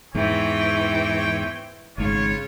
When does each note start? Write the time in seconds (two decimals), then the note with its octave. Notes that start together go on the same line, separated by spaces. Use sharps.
0.15 E2 G#2 E3 C4 C#5 G5
1.98 G#1 G#2 C#3 F4 C#5